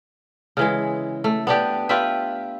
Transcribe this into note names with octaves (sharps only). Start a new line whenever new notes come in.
C#3 E3 G#3
A3
B3 D4 G4
F4 G4 B4 E5